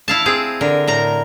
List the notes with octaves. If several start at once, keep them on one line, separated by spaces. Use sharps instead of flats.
E4 F5 A5
C4 G#4
D3 A#4
A2 A#4 A#5